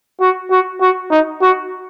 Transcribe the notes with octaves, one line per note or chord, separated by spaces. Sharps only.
F#4
F#4
F#4
D#4
F#4